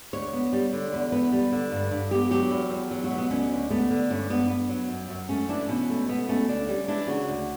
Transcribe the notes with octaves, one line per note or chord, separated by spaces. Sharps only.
D2 C#5
B3
G3
D3
E2
B3 B4
G3
D3
G2
G2
B3 G4
F#3 G4
E2
E2
F#3
F#4
B2
B3
D2 C#4
D2
A3 B3
D3
G2 C#4
G2 B3
B3
F#3
F#2
F#2
A3 C#4
E3 D4
B2 C#4
A3
B2 B3
A3 C#4
D2 D4
G3 C#4
E3 D4
C#3 F#4
D2